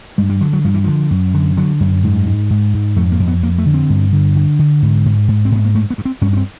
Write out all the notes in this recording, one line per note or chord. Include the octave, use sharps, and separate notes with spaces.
G2 G#3
G3
D3 F#3
F#3
G2 F3
E3
D3 F3
F#2
D3
D3 F#3
F#2
G#2
G#2
G#2
G#2
F2 A3
A#3
F2
B3
F2 A#3
A3
D3
C4
G2
D3
D3
D3
G#2
G#2
G#2
C4
G#2 B3
A#3
G2 A3
B3
G2
C4
G2 C#4
C#4
C4